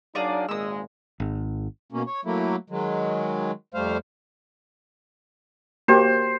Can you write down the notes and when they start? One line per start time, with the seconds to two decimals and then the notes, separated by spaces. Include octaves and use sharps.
0.15 F#3 A#3 D4 D#4 G#4 D5
0.48 G#1 A#2 G#3 D#6 E6
1.20 G#1
1.92 B2 A#3 C#4
2.06 C#5
2.25 F#3 A3 A#3 E4
2.70 D#3 F#3 G#3
3.74 F2 G3 A3 C5 F5
5.88 A#3 F#4 G4 C5